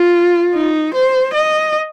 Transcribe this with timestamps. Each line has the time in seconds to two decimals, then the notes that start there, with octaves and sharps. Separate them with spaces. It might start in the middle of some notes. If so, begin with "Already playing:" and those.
Already playing: F4
0.54 D#4
0.94 C5
1.34 D#5